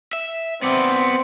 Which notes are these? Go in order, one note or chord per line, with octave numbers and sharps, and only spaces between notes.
E5
B3 C4 D5